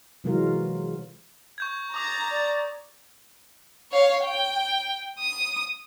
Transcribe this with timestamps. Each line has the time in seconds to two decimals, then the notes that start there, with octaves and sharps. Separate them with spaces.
0.24 C3 E3 F#3 G#3 F4 A#4
1.58 C#6 G6 G#6
1.94 A#5 D6 D#6 A6 A#6
2.31 D5
3.92 C#5 F5
4.23 G5
5.19 D#6